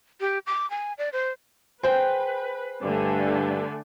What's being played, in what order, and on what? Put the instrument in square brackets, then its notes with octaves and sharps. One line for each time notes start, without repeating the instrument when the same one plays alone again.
[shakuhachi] G4
D6
G#5
D5
C5
[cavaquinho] G#4 G5 [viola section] B4 [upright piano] C5
[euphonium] G2 [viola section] D3 A3 G#5